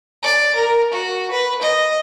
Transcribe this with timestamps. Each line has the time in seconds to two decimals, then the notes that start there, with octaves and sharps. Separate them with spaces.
0.23 D5
0.55 A#4
0.92 F#4
1.31 B4
1.62 D#5